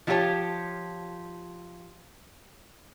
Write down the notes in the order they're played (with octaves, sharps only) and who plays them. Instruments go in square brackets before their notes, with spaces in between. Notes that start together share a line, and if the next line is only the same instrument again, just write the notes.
[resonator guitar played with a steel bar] F3 E4 F4 G4 C#5 A5